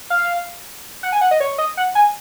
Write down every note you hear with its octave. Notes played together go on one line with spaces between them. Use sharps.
F5
F#5
G#5
F#5
D#5
C#5
D#5
F#5
G#5